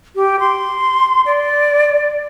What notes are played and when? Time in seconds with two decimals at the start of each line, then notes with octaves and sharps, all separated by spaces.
0.16 G4
0.40 C6
1.26 D5